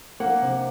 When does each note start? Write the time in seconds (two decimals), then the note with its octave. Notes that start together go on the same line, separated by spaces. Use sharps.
0.20 A#3 F#5
0.42 C3